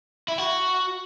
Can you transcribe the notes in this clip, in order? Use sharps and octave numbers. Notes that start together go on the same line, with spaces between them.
E4
F#4